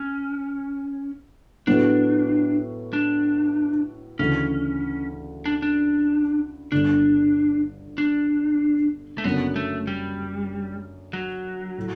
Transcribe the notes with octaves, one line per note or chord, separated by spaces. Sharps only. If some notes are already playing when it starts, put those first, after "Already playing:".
Already playing: C#4
A2 F#3 B3 D4
D4
D2 C#3 E3 C#4
D4
D4
G1 G2 D3 D4
D4
A3
F#1 F#2 D3 B3
A3
G3
F#3
A2